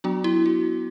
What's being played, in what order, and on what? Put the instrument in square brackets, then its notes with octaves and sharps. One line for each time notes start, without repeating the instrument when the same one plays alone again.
[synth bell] F#3 B3 D4 F#4
E4
F#4